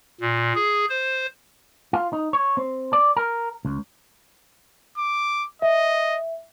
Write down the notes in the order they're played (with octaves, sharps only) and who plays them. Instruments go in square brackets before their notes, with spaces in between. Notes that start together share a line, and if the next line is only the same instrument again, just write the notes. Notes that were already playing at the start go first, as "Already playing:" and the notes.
[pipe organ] A#2
G#4
C5
[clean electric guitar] F4
D#4
C#5
C4
D5
A#4
C#2
[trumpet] D6
[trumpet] D#5 [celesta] E5